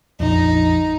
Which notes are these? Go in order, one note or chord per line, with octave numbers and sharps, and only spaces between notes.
A#1 F2 D#4